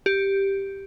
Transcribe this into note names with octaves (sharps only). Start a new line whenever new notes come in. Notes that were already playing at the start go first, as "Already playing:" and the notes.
G4